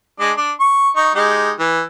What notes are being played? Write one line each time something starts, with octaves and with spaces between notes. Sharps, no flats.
G#3 D4
D4
C#6
D#4 C#6
G#3 D#4 G4
E3